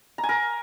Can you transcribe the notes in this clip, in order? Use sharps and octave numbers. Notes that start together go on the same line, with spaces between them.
A#5
G#5
A#4